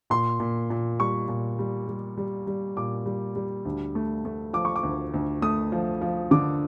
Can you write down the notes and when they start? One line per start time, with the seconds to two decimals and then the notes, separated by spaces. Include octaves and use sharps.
0.10 A#2 C6
0.40 A#2
0.70 A#2
0.99 G3 C#6
1.28 A#2
1.59 G3
1.88 G3
2.17 G3
2.47 G3
2.77 A#2 D6
3.06 G3
3.36 G3
3.65 D2
3.95 A3
4.25 A3
4.53 F3 D6
4.65 C#6
4.76 D6
4.83 D2
5.14 D2
5.42 A3 D#6
5.72 F3
6.01 F3
6.31 D3 D6